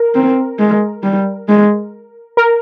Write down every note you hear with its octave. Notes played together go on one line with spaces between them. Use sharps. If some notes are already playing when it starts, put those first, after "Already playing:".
Already playing: A#4
C4
G#3
G3
G#3
A#4